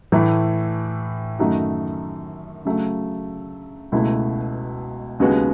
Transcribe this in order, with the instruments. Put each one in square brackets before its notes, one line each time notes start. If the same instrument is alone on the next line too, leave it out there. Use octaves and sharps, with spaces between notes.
[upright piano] A2 E3 A3
F#2 D#3 A3 D#4 F#4
C#3 F#3 A3
C#2 B2 A3 E4
D#2 C#3 G#3 B3 F#4